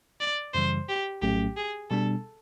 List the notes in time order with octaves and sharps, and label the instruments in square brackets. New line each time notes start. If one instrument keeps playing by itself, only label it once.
[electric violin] D5
[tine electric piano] F#2 C#3 E3 G3 [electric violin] C5
[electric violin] G4
[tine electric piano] A#1 A2 F#3 A3 C#4 [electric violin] G4
[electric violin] G#4
[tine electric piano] B2 G3 B3 D4 [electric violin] A4